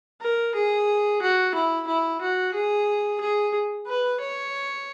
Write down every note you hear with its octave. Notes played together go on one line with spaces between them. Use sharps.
A#4
G#4
F#4
E4
E4
F#4
G#4
G#4
B4
C#5